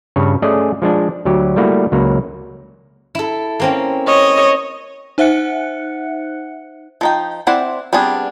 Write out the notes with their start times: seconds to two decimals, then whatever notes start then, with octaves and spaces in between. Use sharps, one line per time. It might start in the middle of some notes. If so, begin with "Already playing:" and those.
0.16 G2 C#3 C#5
0.42 A3 C#4 G#4 D5 D#5
0.82 F3 G#3 D4
1.25 D2 F#3 G4
1.56 G3 A3 A#3 E4 F#4
1.92 C#2 F#3 A#3
3.15 E4 A4
3.60 A#3 C4 C#4
4.06 C#5 D#5
5.18 D#4 C5 E5 F#5 F#6 C#7
7.01 F3 D#4 G5
7.47 C4 E4 C5 D5 F#5
7.93 G3 B3 C4 D4 G#4